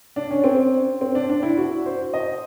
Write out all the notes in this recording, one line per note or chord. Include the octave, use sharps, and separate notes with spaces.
D4
C#4
C4
C4
D4
D4
E4
F#4
C5
D#5